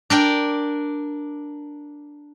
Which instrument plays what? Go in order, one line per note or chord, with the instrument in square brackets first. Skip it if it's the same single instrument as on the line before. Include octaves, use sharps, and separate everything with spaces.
[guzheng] D4 A#4 G5